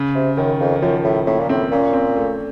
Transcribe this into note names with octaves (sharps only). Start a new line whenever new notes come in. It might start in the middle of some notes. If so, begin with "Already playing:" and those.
Already playing: C#3
C3
F#2 D#3
F2
D#3
F#2 F3
A2
A2 A#3
A#2
A2 C4
A#2 C#4
C4
A3